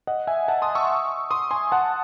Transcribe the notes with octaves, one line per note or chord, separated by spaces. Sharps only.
D#5 F#5
E5 G#5
F#5 A5
C6 D#6
C#6 E6
C6 D#6
G#5 C6
F#5 A5